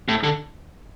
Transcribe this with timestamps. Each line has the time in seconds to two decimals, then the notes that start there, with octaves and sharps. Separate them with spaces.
0.09 A2
0.23 D3